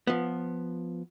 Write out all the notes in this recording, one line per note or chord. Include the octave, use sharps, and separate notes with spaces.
F3 B3